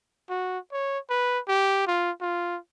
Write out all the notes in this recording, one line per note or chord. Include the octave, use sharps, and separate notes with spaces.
F#4
C#5
B4
G4
F4
F4